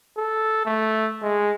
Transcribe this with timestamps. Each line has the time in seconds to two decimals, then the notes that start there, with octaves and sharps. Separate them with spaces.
0.18 A4
0.66 A3
1.22 G#3